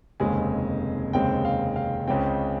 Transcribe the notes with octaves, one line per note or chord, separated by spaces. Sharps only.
F1 D#2 C#3 G#3 C4 G#5
F1 D#2 C#3 G#3 C4 G5
F5
F5
C#2 C#3 G#3 C4 G5